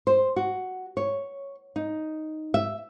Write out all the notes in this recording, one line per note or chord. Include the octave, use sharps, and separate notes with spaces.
C5
F#4
C#5
D#4
E5